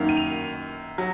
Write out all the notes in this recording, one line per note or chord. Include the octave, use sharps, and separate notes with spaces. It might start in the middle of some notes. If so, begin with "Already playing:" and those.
Already playing: F#2 D#3 A#3 F7
D#7
F7
F#3